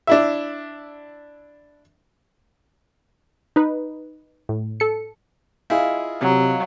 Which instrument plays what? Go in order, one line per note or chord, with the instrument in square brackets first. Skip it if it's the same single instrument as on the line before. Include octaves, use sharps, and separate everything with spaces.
[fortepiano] D4 E4 E5
[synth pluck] D#4 B4
A2
A4 C#7
[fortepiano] E4 G#4 [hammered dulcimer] F4 D#5
[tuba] C3 [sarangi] F#3